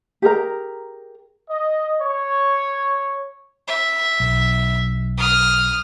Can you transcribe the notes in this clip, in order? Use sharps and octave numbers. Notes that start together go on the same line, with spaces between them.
G4 G#4 A#4 A#5
D#5
C#5
E5
B1
D#6 F6